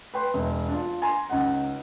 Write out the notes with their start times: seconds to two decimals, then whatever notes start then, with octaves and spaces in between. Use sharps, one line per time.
0.14 B4 G5 C6
0.34 E1
0.69 D4 F4
1.02 G#5 A#5 C6
1.30 C#2 D#4 F#5